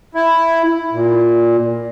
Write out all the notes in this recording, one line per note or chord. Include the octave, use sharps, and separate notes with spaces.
E4
A#2